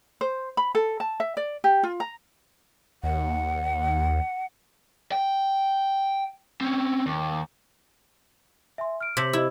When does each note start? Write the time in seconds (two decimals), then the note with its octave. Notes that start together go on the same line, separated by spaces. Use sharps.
0.21 C5
0.57 B5
0.75 A4
1.00 A5
1.20 E5
1.37 D5
1.64 G4
1.83 F4
2.00 A#5
3.03 D#2 F#5
5.12 G5
6.61 C4 C#4
7.06 D#2
8.78 E5 G#5 C6
9.01 F6 D7
9.17 C3 G6 B6 F#7
9.33 E4 G4 D#5